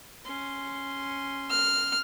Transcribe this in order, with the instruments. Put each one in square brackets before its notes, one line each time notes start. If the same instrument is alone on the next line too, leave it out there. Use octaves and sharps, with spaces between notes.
[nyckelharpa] C#4 C6
[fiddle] F6